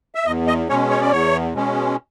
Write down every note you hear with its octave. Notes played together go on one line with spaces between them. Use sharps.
E5
E2 D#5
D#5
B2 G#3 C#4 C#5
C#5
D5
E2 C#5
B2 G#3 C#4